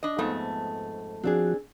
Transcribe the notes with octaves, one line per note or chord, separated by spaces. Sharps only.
D4 D#5
F2 G#2 A3 B3
F3 C4 D4 F#4 G#4